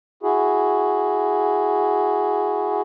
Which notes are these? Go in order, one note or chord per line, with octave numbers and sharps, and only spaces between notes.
E4 F#4 G#4